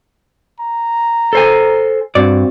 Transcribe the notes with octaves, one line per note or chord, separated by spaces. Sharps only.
A#5
A4 C5 G#5
G2 C4 F#4 D5